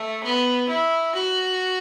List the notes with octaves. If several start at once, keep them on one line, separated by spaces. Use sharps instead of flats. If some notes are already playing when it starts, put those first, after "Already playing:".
Already playing: A3
B3
E4
F#4